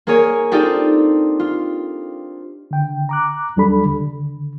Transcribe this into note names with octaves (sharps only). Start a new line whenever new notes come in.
A#3 G#4 A#4 C#5 G#5
C4 D4 D#4 F4 G4 A4
F4
D3 G5
A#5 D6 F#6
D#2 F#3 G3 D4 A4 B5
D3